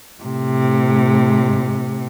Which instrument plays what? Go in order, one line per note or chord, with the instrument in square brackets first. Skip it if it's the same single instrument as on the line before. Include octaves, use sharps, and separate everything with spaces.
[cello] A2 C3